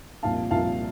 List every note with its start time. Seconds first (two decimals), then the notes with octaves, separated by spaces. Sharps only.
0.23 C2 A#2 F3 F5 A5
0.51 C2 A#2 F3 F5 A5